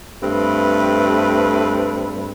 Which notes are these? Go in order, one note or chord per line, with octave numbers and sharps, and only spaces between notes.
G2 A3 C4 B4